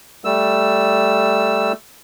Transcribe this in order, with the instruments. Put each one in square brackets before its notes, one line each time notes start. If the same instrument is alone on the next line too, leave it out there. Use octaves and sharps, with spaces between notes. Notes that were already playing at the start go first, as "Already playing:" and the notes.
[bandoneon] G3 A3 E6